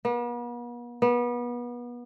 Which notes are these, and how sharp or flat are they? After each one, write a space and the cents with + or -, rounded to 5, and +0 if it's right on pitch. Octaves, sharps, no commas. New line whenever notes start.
B3 -45
B3 -30